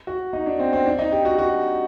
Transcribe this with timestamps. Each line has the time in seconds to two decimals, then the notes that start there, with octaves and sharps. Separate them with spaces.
0.07 F#4
0.33 D#4
0.46 D4
0.59 C4
0.73 C4
0.85 D4
0.99 D#4
1.12 G4
1.25 F#4
1.38 F#4